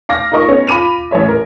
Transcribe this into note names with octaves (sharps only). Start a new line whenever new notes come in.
F5 D6 A#6
D#4 F4 A#4 D#5 C#6
B3 C#4
F4 B5 D6 D#7 F7
A1 E3 C#5 E5
A#4